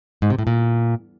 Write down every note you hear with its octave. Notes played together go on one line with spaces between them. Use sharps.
G#2
C3
A2
A#2